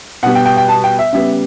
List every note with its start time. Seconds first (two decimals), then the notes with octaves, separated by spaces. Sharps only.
0.23 B2 G3 B3 F#5
0.35 G5
0.46 G5
0.57 G5
0.68 A5
0.84 G5
0.99 E5
1.12 C#3 G3 B3 E5